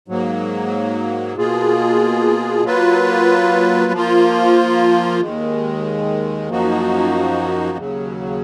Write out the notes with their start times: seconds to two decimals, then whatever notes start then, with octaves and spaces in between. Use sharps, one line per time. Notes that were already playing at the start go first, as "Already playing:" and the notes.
0.08 G#2 F#3 A#3
1.36 B2 A#3 F4 G#4
2.64 F#3 A#3 F4 B4
3.92 F3 A#3 F4
5.21 D#2 D#3 G#3
6.49 F#2 F3 A#3 D#4 F#4
7.78 D#2 C#3 F#3